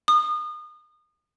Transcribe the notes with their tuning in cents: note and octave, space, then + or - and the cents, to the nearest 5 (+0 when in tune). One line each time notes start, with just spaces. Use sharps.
D#6 -30